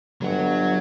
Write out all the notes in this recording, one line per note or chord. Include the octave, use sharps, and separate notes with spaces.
G1 F#3 F#5